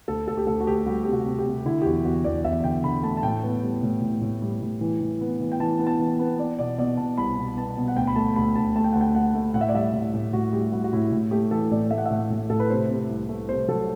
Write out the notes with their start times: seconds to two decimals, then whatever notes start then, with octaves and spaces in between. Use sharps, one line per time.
0.08 D2 A4
0.27 D2 A4
0.37 G4
0.47 D2 A4
0.60 F#4
0.67 D2 G4
0.86 G3 F#4
1.04 C3 G4
1.13 F#4
1.26 C3
1.39 G4
1.46 C3
1.65 D3 E4
1.82 G4
1.85 E2 F#4
2.04 E2 F#4
2.24 E2 D5
2.44 E2 E5
2.64 D3 G5
2.84 D3 B5
3.03 A3 A5
3.17 A5
3.23 A2 G5
3.42 B3
3.62 G3
3.83 A2
4.02 A2
4.21 A2
4.42 G3
4.62 A2
4.81 E3
5.01 E3
5.21 B3
5.40 E3
5.52 G5
5.60 E3 A5
5.79 B3
5.87 A5
5.99 E3
6.19 B3
6.39 B3 D5
6.59 B2 D5
6.78 B2 D5
6.97 B2 A5
7.18 C2 B5
7.38 B2
7.56 B3 A5
7.77 B2
7.88 F#5
7.96 D2 G5
8.07 B5
8.16 A3 A5
8.36 D2 B5
8.56 D2 A5
8.76 A3 A5
8.84 G5
8.93 D2 F#5
9.01 G5
9.15 A3 F#5
9.35 A3
9.54 A2 F#5
9.61 E5
9.69 D5
9.74 G3 E5
9.93 A2
10.14 A2
10.33 A2 F#4
10.53 G3 G4
10.72 G3 F#4
10.84 F#4
10.93 A2 E4
11.12 A2
11.31 A3 G4
11.51 E3 A4
11.71 A2 D5
11.90 A3 E5
11.98 F#5
12.06 A2 E5
12.30 A2
12.50 A2 A4
12.60 B4
12.70 C3 C5
12.89 C3
13.09 C2
13.29 A3
13.49 C3 C5
13.68 F#3 A4